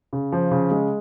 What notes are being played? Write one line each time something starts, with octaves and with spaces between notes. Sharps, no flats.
C#3
F3
C#3
G#3